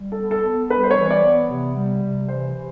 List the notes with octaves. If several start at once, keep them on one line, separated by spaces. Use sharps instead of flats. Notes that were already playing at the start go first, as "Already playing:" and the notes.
Already playing: G3
A4
B3
A4
B3
G3 B4
C5
C#5
E3
D5
B3
C3
G3
C3
E3 C5
E3